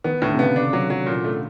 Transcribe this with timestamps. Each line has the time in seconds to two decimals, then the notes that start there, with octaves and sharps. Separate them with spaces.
0.04 D#3 B3
0.22 A2 D3
0.33 C3
0.38 C#3 B3
0.56 C3 D4
0.73 F#3
0.90 F#3
1.06 A#2
1.24 A3